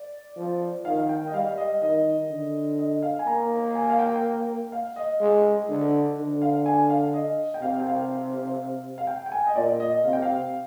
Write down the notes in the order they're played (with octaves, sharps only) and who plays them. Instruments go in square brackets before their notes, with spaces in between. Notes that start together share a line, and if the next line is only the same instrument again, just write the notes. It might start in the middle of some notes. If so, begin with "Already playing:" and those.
Already playing: [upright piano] D5
[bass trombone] F3
[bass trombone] D#3 [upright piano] F5
[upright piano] F5
G5
D#5
[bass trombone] G3 [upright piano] F5
[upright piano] D#5
[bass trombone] D#3 [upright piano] D#5
[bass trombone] D3
[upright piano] D#5
F5
G#5
[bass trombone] A#3 [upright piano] A#5
[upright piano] G#5
F5
G5
F5
D#5
[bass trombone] G#3
D3
D3
[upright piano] F5
G#5
F5
D#5
G5
[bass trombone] C3 [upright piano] F5
[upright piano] G5
F5
F5
G5
G5
G#5
D#5
[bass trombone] A#2 [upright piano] D5
[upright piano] D#5
[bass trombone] C3 [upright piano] F5
[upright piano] G5
F5